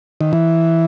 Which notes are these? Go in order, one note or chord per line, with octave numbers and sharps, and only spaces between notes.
D#3
E3